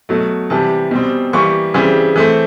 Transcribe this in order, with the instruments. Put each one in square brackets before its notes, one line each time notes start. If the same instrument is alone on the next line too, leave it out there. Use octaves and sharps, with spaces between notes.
[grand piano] B2 F#3 A3
C3 E3 G3 A5
B2 G3 C4
E3 G3 A#3 C#6
C#3 E3 G3 C4
E3 A3 C4